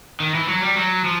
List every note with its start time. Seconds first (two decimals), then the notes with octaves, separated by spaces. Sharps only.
0.20 D#3
0.34 E3
0.48 F#3
0.62 G3
0.76 F#3
1.04 F3